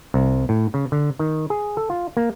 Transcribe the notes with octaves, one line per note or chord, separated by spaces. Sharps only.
C2
A2
C#3
D3
D#3
G#4
A4
F4
A#3